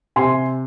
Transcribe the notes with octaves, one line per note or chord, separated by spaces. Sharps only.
C3 G#5 C6